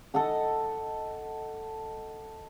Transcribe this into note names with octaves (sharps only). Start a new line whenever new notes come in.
A4 D#5 F#5 A5